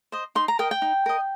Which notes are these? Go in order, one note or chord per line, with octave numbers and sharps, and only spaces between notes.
C5 D#5
D#4 C6
A#5
A#4 D#5 G5
G5
D#4
A#4 D#5